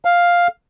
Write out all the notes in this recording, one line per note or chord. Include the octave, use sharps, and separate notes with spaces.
F5